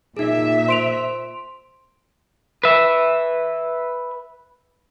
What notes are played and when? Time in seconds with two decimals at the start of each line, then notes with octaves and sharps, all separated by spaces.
0.17 A#2 D#4 G#4 E5
0.68 C5 C6 D7 F7
2.64 B4 E5